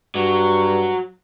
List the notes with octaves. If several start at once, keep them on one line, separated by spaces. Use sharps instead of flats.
G2 F#3